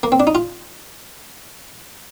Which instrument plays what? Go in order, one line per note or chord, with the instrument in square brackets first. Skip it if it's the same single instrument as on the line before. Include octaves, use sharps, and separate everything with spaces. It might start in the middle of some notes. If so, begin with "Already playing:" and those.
[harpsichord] A#3
C4
D4
D#4
F4